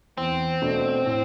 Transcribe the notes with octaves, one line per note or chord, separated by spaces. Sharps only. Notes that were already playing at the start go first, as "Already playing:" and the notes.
E2 C4
B2 A3 D4
A2